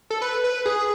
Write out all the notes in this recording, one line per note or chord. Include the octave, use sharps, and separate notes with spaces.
A4
B4
B4
G#4